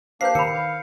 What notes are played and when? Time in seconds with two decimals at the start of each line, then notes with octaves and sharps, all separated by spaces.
0.21 A#3 D4 G4 B4 C5 F5 G6 C7
0.35 D#3 A#4 B5 C#7
0.53 F5